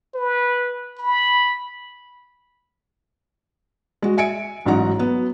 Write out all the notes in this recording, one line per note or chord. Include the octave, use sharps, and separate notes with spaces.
B4
B5
G#3 F#4
E5 G#5 C#7 D7
A1 G#2 F#3 D#4 F#5 A#5
F#3 B3